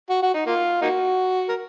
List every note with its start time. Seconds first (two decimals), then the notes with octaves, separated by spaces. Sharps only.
0.10 F#4
0.22 F#4
0.34 D#4
0.46 A#3 F4
0.82 A#3 D#4 F#4
1.49 A#4